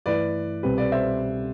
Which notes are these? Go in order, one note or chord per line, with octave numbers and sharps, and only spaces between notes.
G2 E3 A3 E4 B4 D5
C2 B2 G3 C4 G4 B4
B4 D5
C5 E5